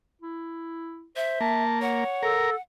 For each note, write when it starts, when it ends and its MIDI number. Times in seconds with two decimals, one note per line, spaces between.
0.22 1.07 64
1.16 1.37 72
1.16 1.63 76
1.41 2.04 58
1.41 1.79 81
1.82 2.38 73
1.82 2.61 78
2.23 2.55 69
2.23 2.50 70